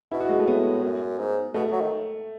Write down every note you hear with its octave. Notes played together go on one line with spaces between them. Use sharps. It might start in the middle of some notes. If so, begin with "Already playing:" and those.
B2 E4
F#4
G#3
A3
A2 B3
F#2
G#2
B2 A3
F#3
D#3